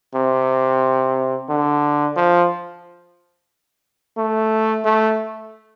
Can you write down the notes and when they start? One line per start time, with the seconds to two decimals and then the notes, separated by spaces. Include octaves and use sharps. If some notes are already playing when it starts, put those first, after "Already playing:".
0.15 C3
1.49 D3
2.16 F3
4.17 A3
4.85 A3